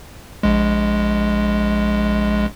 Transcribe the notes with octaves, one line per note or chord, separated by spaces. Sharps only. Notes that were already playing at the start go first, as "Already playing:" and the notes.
A#1 G#3